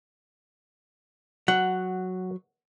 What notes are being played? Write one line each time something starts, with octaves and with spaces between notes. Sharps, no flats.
F#3 F#5